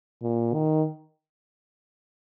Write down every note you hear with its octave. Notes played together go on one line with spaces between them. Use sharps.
A#2
D#3